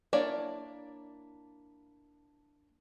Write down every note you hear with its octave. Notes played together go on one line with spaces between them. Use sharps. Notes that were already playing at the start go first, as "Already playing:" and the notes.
A#3 D4 E4 C#5 D5